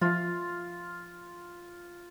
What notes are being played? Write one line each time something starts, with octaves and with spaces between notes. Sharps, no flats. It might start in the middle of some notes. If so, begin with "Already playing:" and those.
F3 F4